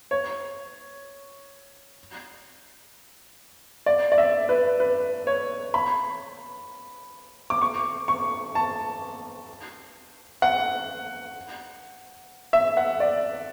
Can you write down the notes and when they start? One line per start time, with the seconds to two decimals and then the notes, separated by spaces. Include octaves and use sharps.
0.11 C#5
3.86 D5
4.12 D5
4.18 E5
4.49 B4
4.80 B4
5.27 C#5
5.74 B5
7.50 D6
7.62 C#6
8.08 C#6
8.55 A5
10.42 F#5
12.53 E5
12.77 F#5
13.00 D5